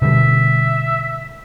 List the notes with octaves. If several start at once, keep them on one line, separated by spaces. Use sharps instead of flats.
B2 D3 G3 E5